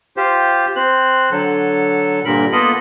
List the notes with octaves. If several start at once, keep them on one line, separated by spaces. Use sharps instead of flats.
F4 G4 C5
C4 C5 F#6
D3 F#3 A4
G2 A#2 D3 A#4 B5
A#3 B3 F4 A4 D#5 B5